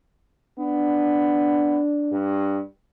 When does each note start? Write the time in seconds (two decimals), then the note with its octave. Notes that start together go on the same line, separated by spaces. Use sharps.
0.59 B3 D4
2.12 G2